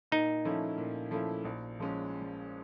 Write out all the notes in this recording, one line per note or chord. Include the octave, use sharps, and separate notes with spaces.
A#2 D#4
F3 A3 C#4 E4
A#2
F3 A3 C#4 E4
A#1
F3 G#3 C#4